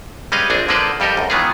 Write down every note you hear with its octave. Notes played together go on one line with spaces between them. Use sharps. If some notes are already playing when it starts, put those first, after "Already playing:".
G3 G#3 C#4 B4 D#5 F5
A#1 C4 D4 G#4
D3 G#3 A#3 B4 C5 D5
F2 G3 G4 A4 A#4 D#5
C#2 F#2
D#3 E3 G#3 B3 F4 G#4